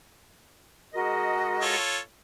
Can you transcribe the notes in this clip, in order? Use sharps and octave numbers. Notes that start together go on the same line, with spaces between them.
G#3 F#4 A#4 D#5
F4 A4 C#5